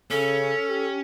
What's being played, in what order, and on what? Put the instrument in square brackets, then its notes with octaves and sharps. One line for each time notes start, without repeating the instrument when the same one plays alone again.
[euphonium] C#3 [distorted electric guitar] C#4 [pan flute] A4
[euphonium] G4